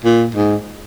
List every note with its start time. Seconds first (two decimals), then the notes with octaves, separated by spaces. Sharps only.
0.05 A#2
0.35 G#2